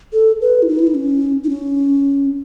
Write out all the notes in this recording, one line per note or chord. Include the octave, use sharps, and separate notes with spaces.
A4
B4
E4
D#4
E4
D#4
C#4
D#4
C#4